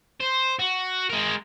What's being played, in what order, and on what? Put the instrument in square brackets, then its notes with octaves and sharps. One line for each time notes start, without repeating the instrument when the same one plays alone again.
[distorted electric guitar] C5
F#4
G#3 A#4